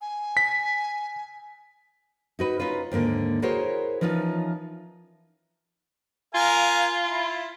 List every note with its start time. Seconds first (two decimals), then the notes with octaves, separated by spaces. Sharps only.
0.01 G#5
0.37 B6
2.39 D#4 F#4 B4
2.60 C#4 D#4 F4 B4
2.92 D#2 G#2 D3 A#3
3.42 E4 F#4 G#4 A#4 C5 C#5
4.01 E3 F3 C#4 D#4 F4
6.35 F4 A#4 F5 G#5
7.05 E4